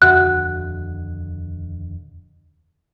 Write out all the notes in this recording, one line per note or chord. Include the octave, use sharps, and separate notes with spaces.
D#1 F2 D3 F#4 E5 F#5 F#6